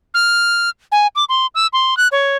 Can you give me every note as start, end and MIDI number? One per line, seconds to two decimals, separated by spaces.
0.14 0.70 89
0.92 1.07 80
1.16 1.25 86
1.29 1.47 84
1.55 1.67 88
1.73 1.97 84
1.97 2.08 90
2.12 2.37 73